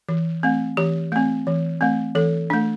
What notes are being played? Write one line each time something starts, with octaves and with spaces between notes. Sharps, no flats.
E3
A3 C4
E3 G4
A3 C4
E3
A3 C4
E3 A4
A3 D4